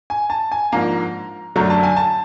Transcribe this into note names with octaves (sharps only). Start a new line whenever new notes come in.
G#5
A5
G#5
G#2 F3 A#3 D4 A#5
F#2 D3 F#3 A3 A#5
A5
G#5
A5